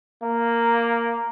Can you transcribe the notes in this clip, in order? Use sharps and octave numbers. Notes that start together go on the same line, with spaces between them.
A#3